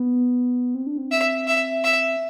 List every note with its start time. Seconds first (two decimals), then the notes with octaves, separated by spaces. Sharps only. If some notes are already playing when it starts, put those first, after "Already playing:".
Already playing: B3
0.75 C4
0.87 D4
0.98 C4
1.12 E5
1.48 E5
1.84 E5